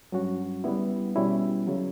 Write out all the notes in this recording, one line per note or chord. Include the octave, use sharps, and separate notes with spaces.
G2 F#3 C#4 F#4
C#3 G3 B3 E4
B2 G3 C#4 E4
C#3 F#3